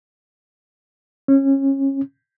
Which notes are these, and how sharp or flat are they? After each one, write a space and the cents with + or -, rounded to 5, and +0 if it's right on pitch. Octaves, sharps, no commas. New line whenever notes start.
C#4 -25